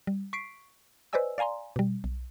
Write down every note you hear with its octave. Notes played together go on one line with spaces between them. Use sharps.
G3
C#6 B6 C7 D7
B4 C5 D5 D#5 G#5 E6
D5 F5 G#5 A#5 C6
B2 G3
B1